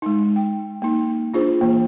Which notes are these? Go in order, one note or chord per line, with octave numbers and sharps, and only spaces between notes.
G#3 D#4
G5
A#3 D#4
D4 F4 G#4 C5
E3 A#3